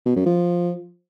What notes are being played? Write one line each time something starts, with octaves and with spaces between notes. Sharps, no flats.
B2
F#2
F3